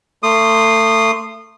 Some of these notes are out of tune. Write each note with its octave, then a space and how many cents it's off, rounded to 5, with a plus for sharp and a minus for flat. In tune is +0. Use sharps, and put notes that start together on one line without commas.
A3 +30 C6 +0 D#6 -25